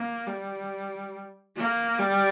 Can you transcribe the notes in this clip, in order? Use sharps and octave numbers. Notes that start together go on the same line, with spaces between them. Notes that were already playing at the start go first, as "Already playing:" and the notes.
Already playing: A#3
G3
A#3
G3